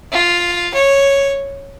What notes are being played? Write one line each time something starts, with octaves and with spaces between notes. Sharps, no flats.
F4
C#5